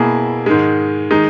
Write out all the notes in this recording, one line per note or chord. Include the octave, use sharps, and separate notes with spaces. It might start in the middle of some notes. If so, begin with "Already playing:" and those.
Already playing: B2 A#3 E4 G#4
G#2 D#3 G#3
D#3 G#3 D#4